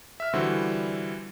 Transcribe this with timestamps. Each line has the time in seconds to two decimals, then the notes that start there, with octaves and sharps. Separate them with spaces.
0.20 E5 F6
0.33 D3 E3 G3 F#4 C5